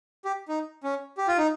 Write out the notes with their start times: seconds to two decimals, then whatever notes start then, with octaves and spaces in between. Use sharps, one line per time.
0.25 G4
0.48 D#4
0.84 C#4
1.18 G4
1.28 F4
1.38 D#4